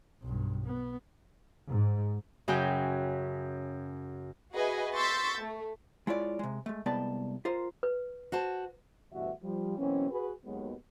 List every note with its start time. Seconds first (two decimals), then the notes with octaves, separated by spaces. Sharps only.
0.22 B1 G2
0.66 B3
1.70 G#2
2.48 F#2 C#3 F#4 G5 G#5 G6
4.53 F#4 G#4 B4 D#5 E5 G#5
4.94 C6 C#6 E6 G6 A6 B6
5.38 A3
6.07 G#3 E4 F4 C#5 D5
6.39 C3 G#3
6.66 G#3 A3
6.86 C2 G#3 B3 D5 G5 A5
7.45 F4 A#4 C5
7.83 B4
8.32 F#4 C5 A5
9.12 D2 G2 B2 E3 F#4 E5
9.43 F3 G3
9.78 B2 E3 F#3 A#3 C4 C#4
10.11 F#4 G#4 B4
10.45 D#2 F#3 G#3 B3